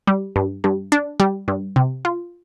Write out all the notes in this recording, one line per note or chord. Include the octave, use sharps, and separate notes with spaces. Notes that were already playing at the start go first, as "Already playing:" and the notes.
G3
G2
G2
D4
G3
G2
C3
F4